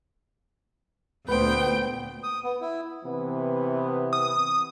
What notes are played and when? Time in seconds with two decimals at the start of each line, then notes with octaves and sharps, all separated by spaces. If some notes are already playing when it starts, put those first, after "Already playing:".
1.29 D2 A#2 B3 B4 C5 G5
2.23 D#6
2.44 B3
2.61 E4
3.04 C3 E3 B3
4.13 D#6